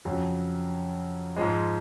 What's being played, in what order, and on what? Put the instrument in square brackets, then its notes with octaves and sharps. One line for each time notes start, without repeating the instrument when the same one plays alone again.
[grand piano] F2 C#3 F#3
G#2 F3 G#3